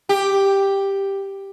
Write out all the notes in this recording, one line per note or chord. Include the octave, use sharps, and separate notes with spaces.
G4